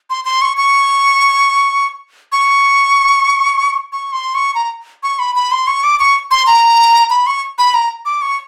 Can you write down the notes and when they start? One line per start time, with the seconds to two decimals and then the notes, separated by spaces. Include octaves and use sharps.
0.10 C6
0.25 C6
0.42 C#6
0.57 C#6
2.32 C#6
3.92 C#6
4.13 C6
4.35 C#6
4.55 A#5
5.03 C#6
5.19 B5
5.36 B5
5.52 C6
5.67 C#6
5.84 D6
5.99 C#6
6.31 C6
6.47 A#5
7.10 B5
7.27 C#6
7.58 B5
7.74 A#5
8.05 D6
8.22 C#6